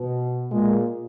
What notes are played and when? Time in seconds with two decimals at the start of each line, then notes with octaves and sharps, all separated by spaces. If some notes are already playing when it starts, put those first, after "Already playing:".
Already playing: B2
0.51 A#2 G#3